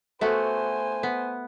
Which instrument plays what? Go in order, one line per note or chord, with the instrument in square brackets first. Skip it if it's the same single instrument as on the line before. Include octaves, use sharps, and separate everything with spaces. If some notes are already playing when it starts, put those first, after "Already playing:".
[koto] A3 B3 F#4 [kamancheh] C5 G#5
[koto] B3